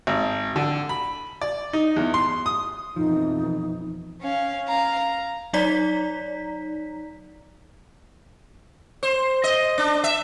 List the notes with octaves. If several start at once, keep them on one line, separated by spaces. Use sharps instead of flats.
G#1
D3
B5
D5
D#4
E2
C6
D#6
F2 B2 E3 F3 D#4
C#4 F5
F5 A#5
A#5
F#3 D#4 C#5 D5 A#5 B6
C5
D#5
D4
E5